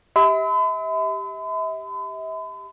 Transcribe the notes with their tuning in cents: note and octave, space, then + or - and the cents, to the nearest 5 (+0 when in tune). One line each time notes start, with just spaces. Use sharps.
G4 +0 E5 -40 B5 +45